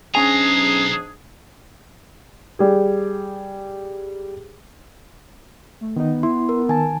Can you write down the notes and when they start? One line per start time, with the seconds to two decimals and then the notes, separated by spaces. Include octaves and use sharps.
0.15 B1 G#2 C#4 D4 G#4 G#5 A#5 C7
2.59 G3 G#4
5.81 A3
5.96 D#3 B3 D#4
6.23 E4 C6
6.49 A#4
6.69 D#3 G#5 A5